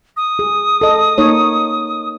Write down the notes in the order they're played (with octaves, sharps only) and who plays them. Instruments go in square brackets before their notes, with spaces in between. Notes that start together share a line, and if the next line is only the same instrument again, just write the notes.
[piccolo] D#6
[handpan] G#4
A4 D#5
A#3 D#4 C#5